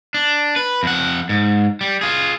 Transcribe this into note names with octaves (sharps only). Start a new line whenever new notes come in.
D4
B4
F2 F#5
G#2
G3
F4 G#4